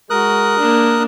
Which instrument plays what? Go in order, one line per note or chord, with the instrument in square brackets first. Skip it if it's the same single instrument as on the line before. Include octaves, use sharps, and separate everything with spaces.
[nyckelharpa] G#3 F#4 [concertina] A#4 D#6 F#6
[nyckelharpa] A#3 D4